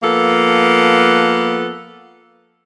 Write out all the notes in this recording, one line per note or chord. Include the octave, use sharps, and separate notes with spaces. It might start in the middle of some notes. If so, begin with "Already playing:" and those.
F3 A#3 B3 A4